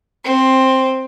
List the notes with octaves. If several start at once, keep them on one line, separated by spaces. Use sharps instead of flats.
C4